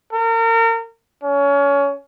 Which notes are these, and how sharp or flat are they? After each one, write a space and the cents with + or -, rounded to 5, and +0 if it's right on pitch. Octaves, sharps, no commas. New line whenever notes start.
A#4 -35
C#4 +25